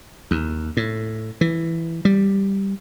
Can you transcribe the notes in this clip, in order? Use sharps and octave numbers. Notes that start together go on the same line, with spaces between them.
D#2
A2
E3
G3